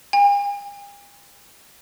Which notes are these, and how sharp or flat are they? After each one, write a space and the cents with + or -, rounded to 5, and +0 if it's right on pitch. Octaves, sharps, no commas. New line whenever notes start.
G#5 -45